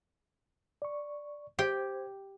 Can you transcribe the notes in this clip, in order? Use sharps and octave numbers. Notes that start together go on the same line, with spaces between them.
D5 C#6
G4 C5 G5 G#6